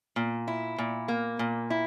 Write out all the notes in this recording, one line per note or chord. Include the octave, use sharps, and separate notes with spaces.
A#2
E4
A#2
A#3
A#2
E4